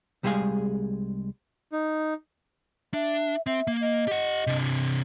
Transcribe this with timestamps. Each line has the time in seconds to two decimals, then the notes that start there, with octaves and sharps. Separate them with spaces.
0.23 C2 G3 G#3 G#4 F5 G#5
1.73 D#4
2.94 D4 E5
3.46 C4 E5
3.67 A#3
3.81 D#5
4.08 G4 F#5
4.47 C3 D4